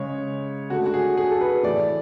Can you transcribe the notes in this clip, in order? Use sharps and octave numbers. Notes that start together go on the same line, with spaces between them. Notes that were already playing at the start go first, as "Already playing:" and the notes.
Already playing: C#3 G#3 C#5
D3 A3 F#4
F#4
G#4
G#4
A4
B4
A2 E3 A3 D5